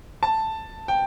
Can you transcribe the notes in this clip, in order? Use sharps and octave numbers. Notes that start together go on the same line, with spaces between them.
A5
G5